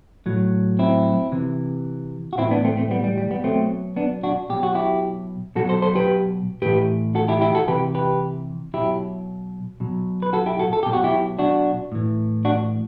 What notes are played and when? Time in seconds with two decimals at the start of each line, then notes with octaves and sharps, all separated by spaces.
0.26 A2 F#3
0.79 C4 E4
1.32 C3 E3
2.33 F#4
2.38 A2 E3 C4 E4
2.51 B3 D4
2.64 A3 C4
2.77 A3 C4
2.91 G3 B3
3.04 G3
3.18 G3
3.31 G3 B3
3.44 B2 F#3 A3 C4
3.96 B3 D4
4.23 D4 F#4
4.50 B2 F#3 G4
4.63 F#4
4.75 E4 G4
5.55 B2 F#3 F#4 A4
5.69 A4 C5
5.82 A4 C5
5.95 G4 B4
6.62 A2 E3 G4 B4
7.15 F#4 A4
7.28 E4 G4
7.41 E4 G4
7.55 F#4 A4
7.67 C3 E3 G4 B4
7.95 G4 B4
8.74 B2 F#3 E4 G4
9.80 B2 F#3
10.22 B4
10.33 F#4 A4
10.46 E4 G4
10.59 F#4 A4
10.73 A4
10.83 B2 F#3 G4
10.93 F#4
11.04 E4 G4
11.39 D4 F#4
11.92 A2 E3
12.45 D4 F#4